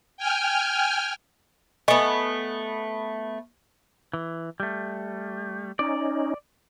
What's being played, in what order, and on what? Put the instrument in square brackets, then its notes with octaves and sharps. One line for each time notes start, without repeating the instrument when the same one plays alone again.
[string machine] G5 G#5 F6
[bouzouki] A3 B3 [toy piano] D#5 G#5 C#6
[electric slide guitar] E3
G3 A3
[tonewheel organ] C#4 D#4 [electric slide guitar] D5